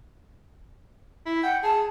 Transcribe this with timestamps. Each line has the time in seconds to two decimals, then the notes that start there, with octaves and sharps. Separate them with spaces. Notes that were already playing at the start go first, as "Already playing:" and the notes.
1.26 E4
1.43 F#5 G5
1.63 G#4 A5